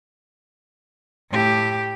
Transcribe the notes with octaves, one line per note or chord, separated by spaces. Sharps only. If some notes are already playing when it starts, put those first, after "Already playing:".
A2 G4